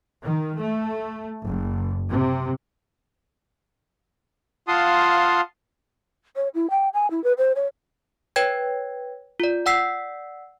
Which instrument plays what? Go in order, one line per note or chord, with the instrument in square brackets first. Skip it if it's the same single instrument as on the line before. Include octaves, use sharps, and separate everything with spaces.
[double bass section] D#3
A3
F#1
C3
[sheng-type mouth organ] F4 F5 F#5 A5 C6 D#6
[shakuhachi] C#5
E4
G5
G#5
E4
B4
C5
C#5
[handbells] B4 C#5 G5 G#6
F4 D5
D5 F#5 E6 B6 C7